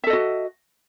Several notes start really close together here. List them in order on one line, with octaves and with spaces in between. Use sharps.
E5 A4 D#5 F#4